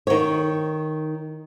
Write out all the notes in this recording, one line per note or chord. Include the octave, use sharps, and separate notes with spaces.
D#3 C#5